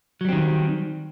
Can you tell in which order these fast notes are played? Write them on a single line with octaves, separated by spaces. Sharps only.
F#3 G3 C4 D#3